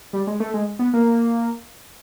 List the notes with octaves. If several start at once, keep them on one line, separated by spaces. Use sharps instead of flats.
G3
G#3
A3
G#3
B3
A#3